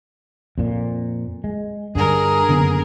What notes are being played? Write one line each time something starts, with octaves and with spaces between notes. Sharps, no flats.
F2 A#2
G#3
G2 D3 G#4 A#4
F#1 D3 B3